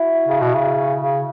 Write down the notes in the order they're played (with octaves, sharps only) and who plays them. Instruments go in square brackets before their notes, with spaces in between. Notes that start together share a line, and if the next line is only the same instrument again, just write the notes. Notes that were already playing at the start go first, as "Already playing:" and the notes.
Already playing: [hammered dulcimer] E4 F#4
[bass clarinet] C#3
B2
C#3
C#3